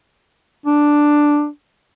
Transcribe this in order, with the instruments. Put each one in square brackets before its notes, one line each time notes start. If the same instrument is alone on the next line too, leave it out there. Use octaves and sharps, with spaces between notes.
[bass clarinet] D4